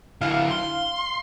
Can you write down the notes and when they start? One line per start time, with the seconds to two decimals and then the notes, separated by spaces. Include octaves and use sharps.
0.21 D3 E4 F5
0.51 C6